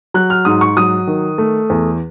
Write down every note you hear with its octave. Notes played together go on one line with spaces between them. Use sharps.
F#3 F#6
F6
G#2 D#6
C#6
F#3 D#6
D#3
A3
E2